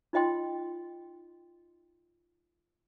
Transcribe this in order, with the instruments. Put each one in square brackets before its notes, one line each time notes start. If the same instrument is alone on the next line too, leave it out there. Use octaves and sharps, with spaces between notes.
[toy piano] D#4 F4 D#5 G5 C6